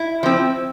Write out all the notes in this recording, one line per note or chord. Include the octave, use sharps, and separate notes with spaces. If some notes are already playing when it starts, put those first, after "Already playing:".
Already playing: E4
F3 C4